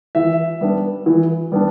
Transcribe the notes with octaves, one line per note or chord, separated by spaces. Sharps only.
E3 E5
G3 B3 D4
E3
G3 B3 D4